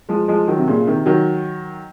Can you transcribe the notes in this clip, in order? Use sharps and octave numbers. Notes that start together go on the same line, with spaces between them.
F3 G#3
F3 G#3
D#3 F#3
C3
A#2 C#3
C3 D#3
D#3 F#3